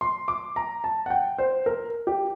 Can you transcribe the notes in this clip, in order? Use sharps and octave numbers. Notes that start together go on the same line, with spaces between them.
C6
D6
A#5
A5
F#5
G5
C5
A#4
G4